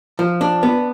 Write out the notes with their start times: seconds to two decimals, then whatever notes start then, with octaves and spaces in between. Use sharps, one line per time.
0.19 F3
0.41 D4
0.63 B3